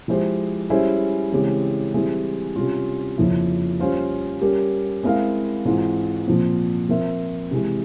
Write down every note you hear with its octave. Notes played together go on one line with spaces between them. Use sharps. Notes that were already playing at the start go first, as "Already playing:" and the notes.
F3 G#3 E4 G4 C5
G3 C#4 E4 G#4 C5
C#3 E3 G#3 C4 G4
E3 G3 C4 E4 G#4
C3 G3 C#4 F4
F2 C#3 F3 A#3 E4
G3 C#4 F4 C5 F5
G3 C#4 G4 A#4
G#3 C4 E4 A#4 F5
G#2 E3 G#3 C4 F4
A#2 F3 C4
F3 C4 F4 A#4 E5
C3 E3 G#3